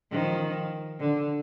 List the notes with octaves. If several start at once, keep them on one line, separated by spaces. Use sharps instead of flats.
D#3 F3
D3